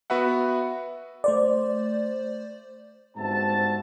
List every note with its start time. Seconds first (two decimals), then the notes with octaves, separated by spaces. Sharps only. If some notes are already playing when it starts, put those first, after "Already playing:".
0.10 B3 F#4 B4 E5 F#5
1.24 A3 C5 D5
3.17 G1 G#2 C4 F#4 E5 A5